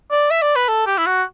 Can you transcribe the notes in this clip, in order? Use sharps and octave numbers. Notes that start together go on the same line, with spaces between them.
D5
E5
D5
B4
A4
G4
E4
F#4